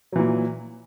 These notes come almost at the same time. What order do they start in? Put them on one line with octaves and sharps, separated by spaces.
F#3 E3 A#2